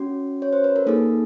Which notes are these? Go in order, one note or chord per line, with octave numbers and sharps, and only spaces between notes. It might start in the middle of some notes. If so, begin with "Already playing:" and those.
Already playing: C#4 F#4
C#5
C5
B4
A#4
A#3 D#4 G#4 A4